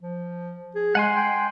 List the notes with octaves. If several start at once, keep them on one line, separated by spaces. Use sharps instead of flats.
F3
G#4
G#3 F#5 G#5 C6
G5